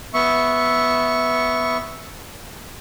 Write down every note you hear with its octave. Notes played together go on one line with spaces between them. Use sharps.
B3 E5 C#6